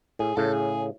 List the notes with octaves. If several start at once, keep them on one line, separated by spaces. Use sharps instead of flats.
A2 G#4
A2 C#3 A4
G#4